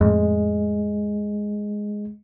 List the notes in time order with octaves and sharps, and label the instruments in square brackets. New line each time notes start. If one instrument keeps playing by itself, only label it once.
[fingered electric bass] F2 A2 [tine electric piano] G#3